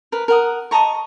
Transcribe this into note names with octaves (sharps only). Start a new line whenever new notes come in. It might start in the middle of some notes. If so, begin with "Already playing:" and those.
A#4 B4
A#4 F#5 D#6
D#5 A5 A#5 C#6